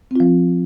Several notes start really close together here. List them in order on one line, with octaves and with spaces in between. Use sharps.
C4 F4 F3